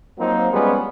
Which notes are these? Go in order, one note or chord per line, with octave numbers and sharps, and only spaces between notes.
F3 F#3 A#3 C4 D#4
F3 G3 G#3 B3 C#4